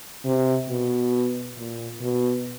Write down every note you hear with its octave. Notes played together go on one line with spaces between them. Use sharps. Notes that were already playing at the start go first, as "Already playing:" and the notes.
C3
B2
A#2
B2